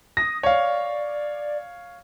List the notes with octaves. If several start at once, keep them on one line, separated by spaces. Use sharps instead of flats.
D#6 A#6
C#5 D5 F5